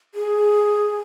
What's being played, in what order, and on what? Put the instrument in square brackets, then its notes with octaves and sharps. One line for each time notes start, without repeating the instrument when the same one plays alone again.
[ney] G#4